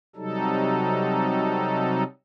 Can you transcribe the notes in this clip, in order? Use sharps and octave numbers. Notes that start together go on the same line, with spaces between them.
C3 F#3 G3 D#4 A4